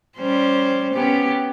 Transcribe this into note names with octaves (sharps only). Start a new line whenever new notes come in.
G3 C#4 C5
B3 C#4 G4